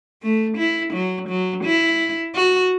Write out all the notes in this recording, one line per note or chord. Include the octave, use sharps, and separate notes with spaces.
A3
E4
F#3
F#3
E4
F#4